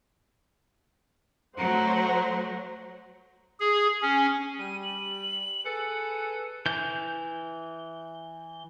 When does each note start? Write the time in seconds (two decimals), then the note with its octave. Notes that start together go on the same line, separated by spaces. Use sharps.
1.59 F#3 A3 C5 F#5 A#5
3.60 G#4
4.02 C#4
4.59 G3 D#7
4.83 F#7
5.65 G#4 A4 B4 C#7
6.66 E3 G6